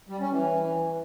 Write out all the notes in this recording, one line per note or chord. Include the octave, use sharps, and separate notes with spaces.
G3
C#4
E3